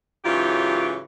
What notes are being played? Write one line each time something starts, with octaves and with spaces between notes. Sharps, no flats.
G#2 C#3 E3 F#3 F4 G4